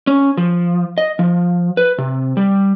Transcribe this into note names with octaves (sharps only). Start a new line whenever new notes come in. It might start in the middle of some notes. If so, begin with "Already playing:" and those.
C#4
F3
D#5
F3
B4
C3
G3